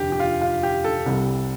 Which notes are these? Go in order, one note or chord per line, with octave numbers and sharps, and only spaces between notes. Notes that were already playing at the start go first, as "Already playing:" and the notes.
Already playing: F1 D#2 D3 G4
G4
F4
F4
G4
A4
C2 C3 G3